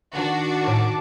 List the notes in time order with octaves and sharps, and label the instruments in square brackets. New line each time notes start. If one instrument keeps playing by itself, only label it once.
[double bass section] D#3 [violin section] D4 F#4
[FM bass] A2 [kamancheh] A5 D6